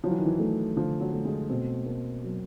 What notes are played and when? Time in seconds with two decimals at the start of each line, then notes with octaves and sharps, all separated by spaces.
0.04 F3 F#3
0.10 E3
0.18 D#3
0.26 E3
0.39 A3
0.76 D3 F3
1.01 F#3
1.13 A3
1.25 G#3
1.49 B2 C4
1.86 A#3
2.24 F#3